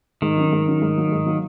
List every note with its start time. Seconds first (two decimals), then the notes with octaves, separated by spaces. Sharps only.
0.22 G#2 D#3
0.37 F#3 C#4
0.53 G#2
0.67 F#3 C#4
0.82 G#2
0.98 F#3 A#3
1.12 G#2
1.26 F#3 A#3